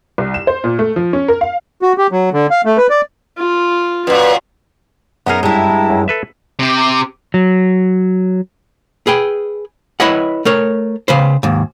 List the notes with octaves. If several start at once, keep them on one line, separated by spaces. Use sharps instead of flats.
C2
E7
C5
A#2
A3
F3
C#4
A#4
F5
F#4
G4
F#3
D3
F5
A3
B4
D5
F4
F#2 A#2 B4
F#2 B3 D#4 G#4 A#4
G2 G#3 E4 G5 A5 A#5
F#2
A4 B4 E5
C3 G4
F#3
G#4 B4 G5
E4 B4 C#5 D#5 F#5
A3 A#4 C#5
C#3 B4 C5
D#2 G#2